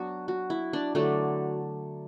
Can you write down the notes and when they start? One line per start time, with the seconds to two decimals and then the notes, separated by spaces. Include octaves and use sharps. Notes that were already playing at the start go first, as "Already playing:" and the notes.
Already playing: F#3 B3 D4 F#4
0.28 F#4
0.50 E4
0.73 D4
0.95 D3 F#3 A3 D4